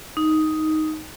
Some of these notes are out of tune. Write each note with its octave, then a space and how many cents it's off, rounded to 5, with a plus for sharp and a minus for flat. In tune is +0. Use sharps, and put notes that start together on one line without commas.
D#4 +5